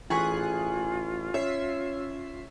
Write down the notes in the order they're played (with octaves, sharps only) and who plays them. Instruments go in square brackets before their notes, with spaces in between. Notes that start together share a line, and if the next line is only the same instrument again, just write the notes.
[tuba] A1 [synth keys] E3 G#4 F#6 [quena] F4 [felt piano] G#5 C#6 B6
[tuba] C#4 [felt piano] C#5 [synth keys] E5 C7